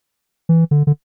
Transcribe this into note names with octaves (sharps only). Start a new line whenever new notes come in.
E3
D3
D3